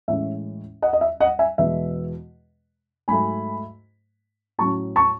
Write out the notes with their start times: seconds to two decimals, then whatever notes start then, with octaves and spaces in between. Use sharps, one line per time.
0.08 A2 E3 G#3 C#4 E5
0.82 D#5 F#5
0.93 D#5
1.01 E5
1.20 D#5 F#5
1.39 E5 G#5
1.58 E2 B2 G#3 B3 E5
3.08 G#2 F#3 A3 G#5 B5
4.58 A2 F#3 C#4 A5 C#6
4.96 A5 C#6